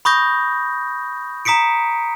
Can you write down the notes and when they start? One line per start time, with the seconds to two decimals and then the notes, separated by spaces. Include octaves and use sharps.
0.05 B5 C#6 D#6 G6 A#6
1.45 A#5 D#6 B6 C#7 D7